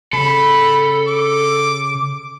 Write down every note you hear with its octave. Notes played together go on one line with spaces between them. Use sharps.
C#3 A4 B5
D6